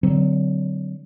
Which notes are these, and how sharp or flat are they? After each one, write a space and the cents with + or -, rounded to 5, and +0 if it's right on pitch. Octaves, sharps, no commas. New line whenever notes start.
D3 +0 F#3 +15 C4 -25